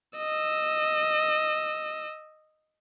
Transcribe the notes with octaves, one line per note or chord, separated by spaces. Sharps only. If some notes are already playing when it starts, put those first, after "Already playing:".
D#5 E6